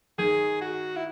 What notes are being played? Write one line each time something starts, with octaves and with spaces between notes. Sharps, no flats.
D#3 G#4
F#4
E4